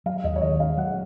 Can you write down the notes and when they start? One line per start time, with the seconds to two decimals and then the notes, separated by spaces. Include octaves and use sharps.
0.06 F#3 F5
0.24 D#2 D#5
0.36 C#5
0.41 D#3 D#5
0.59 C#4 F5
0.77 F#3 F#5